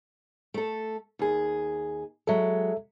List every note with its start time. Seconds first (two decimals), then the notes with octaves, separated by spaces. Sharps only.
0.54 A3 A4
1.19 D#2 G#4
2.27 F#3 G#3 A4 E5